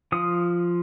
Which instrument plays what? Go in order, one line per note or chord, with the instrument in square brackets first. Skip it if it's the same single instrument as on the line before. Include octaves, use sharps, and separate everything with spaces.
[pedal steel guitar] F3 D#6